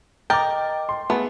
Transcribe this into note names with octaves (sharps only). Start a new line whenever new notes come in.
A#4 D#5 G5 D6 A6
C6
A3 B3 G#4